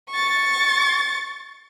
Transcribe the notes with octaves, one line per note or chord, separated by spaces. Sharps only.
C#6 A6